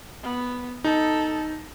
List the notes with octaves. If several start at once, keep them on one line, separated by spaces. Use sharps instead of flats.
B3
D#4 A4